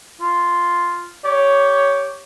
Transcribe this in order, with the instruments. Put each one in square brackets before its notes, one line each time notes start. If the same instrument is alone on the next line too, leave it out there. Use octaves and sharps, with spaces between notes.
[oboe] F4
[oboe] G4 [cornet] C#5